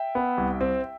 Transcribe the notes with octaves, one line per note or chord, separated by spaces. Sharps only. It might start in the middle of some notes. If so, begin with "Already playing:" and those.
Already playing: E5 G5
B3
C2
C4